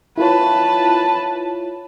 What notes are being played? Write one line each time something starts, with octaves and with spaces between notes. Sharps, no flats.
E4 F4 B4 C#5 A5